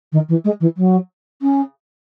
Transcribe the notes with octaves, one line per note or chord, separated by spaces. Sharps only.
D#3
E3
G#3
E3
F#3
C#4